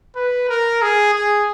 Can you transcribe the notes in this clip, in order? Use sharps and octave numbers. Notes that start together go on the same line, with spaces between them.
B4
A#4
G#4
G#4